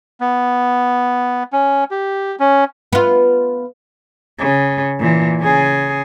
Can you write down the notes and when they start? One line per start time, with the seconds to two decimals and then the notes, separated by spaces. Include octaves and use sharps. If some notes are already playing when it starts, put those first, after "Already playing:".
0.21 B3
1.53 C#4
1.91 G4
2.40 C#4
2.93 B3 F4
4.39 C#3
4.99 A#2 E3
5.40 C#3 G#4